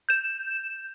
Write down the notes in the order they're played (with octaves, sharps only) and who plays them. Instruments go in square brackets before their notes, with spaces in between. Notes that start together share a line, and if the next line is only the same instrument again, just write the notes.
[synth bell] G6 E7